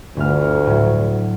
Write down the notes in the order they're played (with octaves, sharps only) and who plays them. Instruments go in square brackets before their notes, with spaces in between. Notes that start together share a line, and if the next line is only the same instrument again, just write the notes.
[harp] G1 F6 [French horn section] D2
[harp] A2 F#3